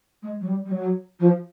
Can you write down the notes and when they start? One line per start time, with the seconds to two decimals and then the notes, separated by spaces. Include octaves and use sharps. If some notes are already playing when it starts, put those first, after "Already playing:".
0.22 G#3
0.40 F#3
0.47 G3
0.64 G3
0.71 F#3
1.19 F3